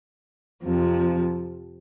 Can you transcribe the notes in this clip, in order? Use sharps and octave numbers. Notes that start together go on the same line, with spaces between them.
F2 C3 F3